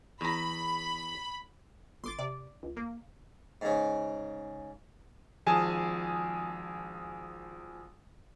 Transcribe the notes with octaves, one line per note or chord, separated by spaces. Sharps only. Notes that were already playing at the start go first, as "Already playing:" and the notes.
E2 A#5 B5
G1 C6 D6 A6
C3 D5
C#2
A#3
G#2 C#3
G#1 F3 G#4 G#5 A5